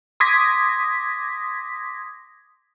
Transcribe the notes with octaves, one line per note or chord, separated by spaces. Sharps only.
C6 D6 D#6 G#6 A#6 B6